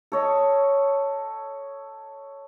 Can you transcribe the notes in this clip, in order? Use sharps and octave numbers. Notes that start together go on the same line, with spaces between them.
A4 C#5 D#5